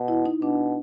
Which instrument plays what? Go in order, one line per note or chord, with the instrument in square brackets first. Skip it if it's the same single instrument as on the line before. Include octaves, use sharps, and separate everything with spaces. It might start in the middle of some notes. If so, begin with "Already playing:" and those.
Already playing: [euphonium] B2
[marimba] E4
D#4
[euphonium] B2 [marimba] D4